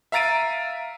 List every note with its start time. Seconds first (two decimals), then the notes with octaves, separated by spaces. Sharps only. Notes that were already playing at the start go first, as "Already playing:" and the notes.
0.12 E5 F5 A#5 A6 D7 D#7